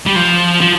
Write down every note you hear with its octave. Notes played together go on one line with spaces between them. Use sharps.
G3
F3
F3